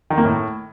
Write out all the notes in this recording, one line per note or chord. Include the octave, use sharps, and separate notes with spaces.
D#3
A#3
A2